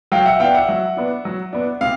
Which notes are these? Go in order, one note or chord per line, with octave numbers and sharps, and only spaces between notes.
F#3 F5 G5
E5 F#5
B3 D4 F5 G5
E5 F#5
F#3
B3 D4
F#3
B3 D4
C3 F5